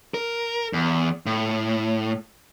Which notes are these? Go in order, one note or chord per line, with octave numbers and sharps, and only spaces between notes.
A#4
E2
A2